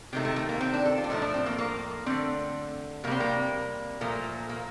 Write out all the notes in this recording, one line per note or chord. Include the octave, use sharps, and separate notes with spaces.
C3 D#3 A3 C4
A3
A3
A#3
C4
D4
A4
F4
D4
A2 F3 A3 D#4
D4
C4
A#3
A#3
D3 A3 C4
C3 G3 A#3 C4
A#3
A#2 F3 A3 A#3
A#3